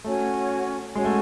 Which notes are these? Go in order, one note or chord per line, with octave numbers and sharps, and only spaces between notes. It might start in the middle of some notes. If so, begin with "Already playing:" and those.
A3 C#4 F#4 C#5 G#5
G#3 C#4 F#4 C#5 G#5
A3